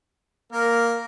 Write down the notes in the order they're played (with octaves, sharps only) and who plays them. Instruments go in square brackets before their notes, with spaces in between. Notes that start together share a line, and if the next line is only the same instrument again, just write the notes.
[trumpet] A#3 [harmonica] A#4